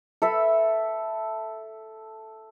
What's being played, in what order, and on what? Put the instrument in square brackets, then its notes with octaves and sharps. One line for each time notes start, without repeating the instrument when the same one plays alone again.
[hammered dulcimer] A4 E5 B5